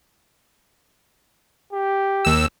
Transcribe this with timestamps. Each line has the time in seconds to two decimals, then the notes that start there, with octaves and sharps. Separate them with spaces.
1.73 G4
2.25 D#2 E6